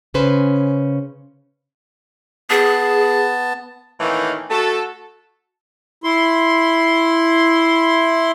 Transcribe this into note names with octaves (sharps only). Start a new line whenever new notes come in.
C#3 C#4 B4 C5
B3 G#4 A5
A2 D#3 E3 A#3 C#4
A3 F#4 A4
E4 C6